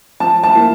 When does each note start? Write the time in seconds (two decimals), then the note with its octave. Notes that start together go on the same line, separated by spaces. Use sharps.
0.20 F3 A5
0.44 A5
0.55 A#3 E4